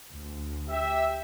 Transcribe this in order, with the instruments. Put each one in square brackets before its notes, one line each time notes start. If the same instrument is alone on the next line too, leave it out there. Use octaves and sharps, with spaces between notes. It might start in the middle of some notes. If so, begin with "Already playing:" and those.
[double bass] D2
[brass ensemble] G4 E5